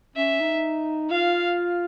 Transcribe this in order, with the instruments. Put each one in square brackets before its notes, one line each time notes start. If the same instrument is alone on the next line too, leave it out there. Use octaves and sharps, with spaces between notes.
[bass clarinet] C#4 [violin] E5
[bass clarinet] D#4
[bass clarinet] F4 [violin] F5